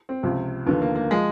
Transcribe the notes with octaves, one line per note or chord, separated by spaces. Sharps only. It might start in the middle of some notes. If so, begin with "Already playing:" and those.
C4
C#2 C3 F3
D#2 D3 F3 B3
A#3
A#3
F3 G#3